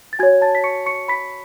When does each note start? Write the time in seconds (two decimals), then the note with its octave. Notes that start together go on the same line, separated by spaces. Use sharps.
0.13 A6
0.19 F#4 G#5 G#6
0.23 C#5
0.42 A5 A6
0.55 B6
0.64 C#6 C#7
0.86 C#6 C#7
1.08 B5 B6